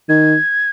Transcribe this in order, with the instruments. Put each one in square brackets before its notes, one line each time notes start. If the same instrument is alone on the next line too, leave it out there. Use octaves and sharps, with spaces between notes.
[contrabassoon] D#3 [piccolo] G#6